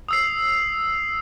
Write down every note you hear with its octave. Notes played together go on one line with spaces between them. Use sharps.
D#6 E6 C7